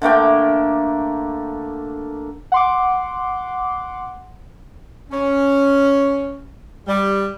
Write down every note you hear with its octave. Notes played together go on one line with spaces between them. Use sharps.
D3 A3 A#3 G5
F#5 C6 D6
C#4
G3